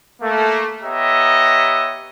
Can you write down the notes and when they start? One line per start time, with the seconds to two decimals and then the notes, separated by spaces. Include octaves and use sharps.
0.22 A3 A#3
0.82 B3 G4 C#5 D#5 E5 A#5